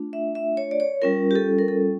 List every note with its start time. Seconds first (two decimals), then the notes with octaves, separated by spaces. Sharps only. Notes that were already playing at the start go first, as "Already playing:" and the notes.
Already playing: A3 D4 F4
0.13 E5
0.35 E5
0.57 C#5
0.71 D5
0.80 C#5
1.02 G3 C#4 F4 A#4
1.31 G4
1.35 A4
1.58 A#4
1.68 A4